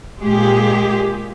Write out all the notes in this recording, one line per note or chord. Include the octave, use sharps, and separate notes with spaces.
A#2 G#3 G4 G#4